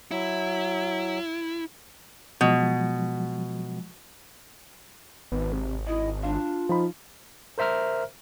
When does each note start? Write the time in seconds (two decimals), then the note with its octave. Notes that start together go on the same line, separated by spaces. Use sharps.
0.11 F#3 E4
2.41 B2 F3 F#3 G#3
5.32 G#1 B3
5.53 C3
5.87 E4 D#5
6.23 D4 F4
6.69 F3 D#4 B5
7.58 A#4 C5 E5 A#5 F6